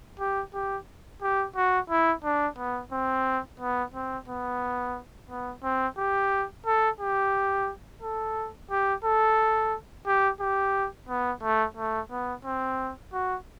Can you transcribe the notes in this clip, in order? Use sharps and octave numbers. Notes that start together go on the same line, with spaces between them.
G4
G4
G4
F#4
E4
D4
B3
C4
B3
C4
B3
B3
C4
G4
A4
G4
A4
G4
A4
G4
G4
B3
A3
A3
B3
C4
F#4